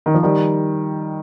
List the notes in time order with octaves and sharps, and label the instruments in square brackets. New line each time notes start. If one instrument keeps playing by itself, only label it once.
[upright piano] D#3
F3
D#3 G3